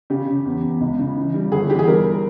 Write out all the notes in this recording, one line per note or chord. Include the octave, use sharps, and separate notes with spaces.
C#3 G4
C#3
E2
E2
C#2
C#3
E3
G3
G1 G#4
E3 G4
G#4
G3 A#4